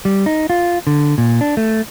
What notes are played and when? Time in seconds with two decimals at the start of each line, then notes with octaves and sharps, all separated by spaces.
0.05 G3
0.26 D#4
0.50 F4
0.87 D3
1.18 A#2
1.41 D4
1.57 A3